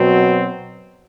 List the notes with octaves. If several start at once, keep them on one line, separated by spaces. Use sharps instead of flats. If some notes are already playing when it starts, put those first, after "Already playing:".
Already playing: B2 F#3 C4